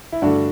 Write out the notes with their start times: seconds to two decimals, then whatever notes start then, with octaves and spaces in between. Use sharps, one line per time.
0.12 E4
0.22 G2 D3 A3 D4 F#4